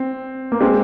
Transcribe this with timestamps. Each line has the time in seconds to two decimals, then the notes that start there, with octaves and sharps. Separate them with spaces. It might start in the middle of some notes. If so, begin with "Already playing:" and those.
Already playing: C4
0.52 A#3
0.61 G#3 C4